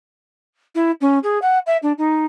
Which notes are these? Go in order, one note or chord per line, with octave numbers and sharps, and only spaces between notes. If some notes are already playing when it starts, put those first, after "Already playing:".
E4
C#4
G#4
F#5
E5
D4
D#4